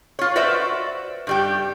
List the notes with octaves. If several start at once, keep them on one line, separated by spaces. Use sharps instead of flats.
F4 C#5
F#4 B4 C5 D5 E5
G2 G3 G4